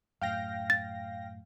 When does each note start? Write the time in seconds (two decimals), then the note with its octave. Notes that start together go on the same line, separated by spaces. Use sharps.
0.21 F#2 A2 F5 G5 A#6
0.70 A6